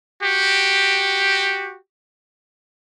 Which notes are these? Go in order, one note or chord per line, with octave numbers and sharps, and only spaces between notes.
F#4 G4